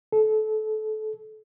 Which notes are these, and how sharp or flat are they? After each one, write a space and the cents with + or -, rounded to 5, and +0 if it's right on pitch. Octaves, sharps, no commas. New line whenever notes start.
A4 -25